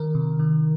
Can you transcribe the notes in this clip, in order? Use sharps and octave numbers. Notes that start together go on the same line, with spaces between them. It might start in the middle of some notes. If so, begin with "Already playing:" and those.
Already playing: D#3 A#4
C3
D#3